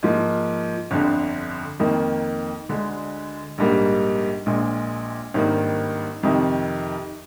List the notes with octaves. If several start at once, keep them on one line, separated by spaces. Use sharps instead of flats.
G#2 F3 A#3 D#4
G1 F2 D3
F2 D#3 A#3
D2 D3 G#3
A#1 G#2 G3 A#3
A#1 A#2 G#3
G#1 G2 D#3 A#3
F2 C3 D#3